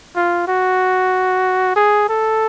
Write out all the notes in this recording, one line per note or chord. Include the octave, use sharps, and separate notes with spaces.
F4
F#4
G#4
A4